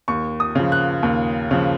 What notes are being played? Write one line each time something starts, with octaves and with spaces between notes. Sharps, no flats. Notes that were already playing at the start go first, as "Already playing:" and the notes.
D#2 C#6
D#6
C#3 F3
F#6
D#2
C#3 F3